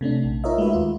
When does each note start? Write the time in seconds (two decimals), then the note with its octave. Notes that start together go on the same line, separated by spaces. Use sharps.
0.01 C3 A3 C#4 D4
0.24 A#1
0.44 D#4 F4 A#4 C#5 D#5 E5
0.58 G#3 A3 F#4 B4 E5
0.73 D#2 F4